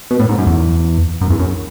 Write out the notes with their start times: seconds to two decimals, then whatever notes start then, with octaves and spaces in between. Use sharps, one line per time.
0.11 B2
0.20 A2
0.29 G#2
0.38 F#2
0.47 E2
1.21 F#2
1.30 E2
1.39 F#2